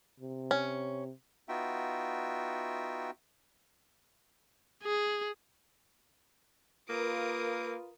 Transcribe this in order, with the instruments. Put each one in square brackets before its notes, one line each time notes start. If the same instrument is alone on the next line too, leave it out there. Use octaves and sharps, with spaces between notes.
[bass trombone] C3
[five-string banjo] C#4
[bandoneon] B3 D#4 F4 F#4 E5 G5
[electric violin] G#4
[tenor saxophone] A#3 [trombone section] F4 B4 [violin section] A#4 D#6 D7